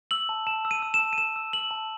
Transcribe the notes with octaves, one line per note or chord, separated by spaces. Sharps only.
E6 F#7
A5
A5 E7
E6
D#7
E6
E7
A5
D#7
A5 E7
E6
E6 F#7
A5